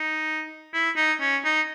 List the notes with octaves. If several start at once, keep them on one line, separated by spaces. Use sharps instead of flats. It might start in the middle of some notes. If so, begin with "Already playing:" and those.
Already playing: D#4
E4
D#4
C#4
D#4